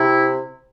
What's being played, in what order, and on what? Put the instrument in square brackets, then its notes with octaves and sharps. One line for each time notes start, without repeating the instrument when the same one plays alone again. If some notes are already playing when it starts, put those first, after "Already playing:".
Already playing: [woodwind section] C3 E4